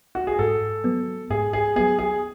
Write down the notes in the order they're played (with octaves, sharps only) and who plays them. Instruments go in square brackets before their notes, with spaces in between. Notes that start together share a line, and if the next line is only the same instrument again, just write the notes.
[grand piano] F#4
G#4
[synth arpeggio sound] G#2 [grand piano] A4
[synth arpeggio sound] F#3 B3
[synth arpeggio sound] G#2 [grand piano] G#4
[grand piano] G#4
[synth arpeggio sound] F#3 B3 [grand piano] G#4
[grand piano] G#4